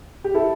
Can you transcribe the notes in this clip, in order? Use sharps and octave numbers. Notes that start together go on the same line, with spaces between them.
G4
E4 A4